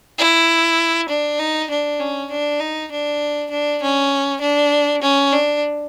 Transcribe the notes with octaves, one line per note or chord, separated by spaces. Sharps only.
E4
D4
D#4
D4
C#4
D4
D#4
D4
D4
C#4
D4
C#4
D4